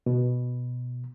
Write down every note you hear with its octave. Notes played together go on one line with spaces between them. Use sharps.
B2